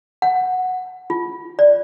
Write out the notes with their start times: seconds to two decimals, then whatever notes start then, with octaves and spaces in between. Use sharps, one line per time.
0.22 F#5
1.10 F4
1.59 D5